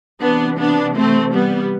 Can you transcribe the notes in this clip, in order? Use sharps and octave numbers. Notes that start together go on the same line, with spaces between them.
C3 E3 B3 D4
B3 D4
A3 C4
G3 B3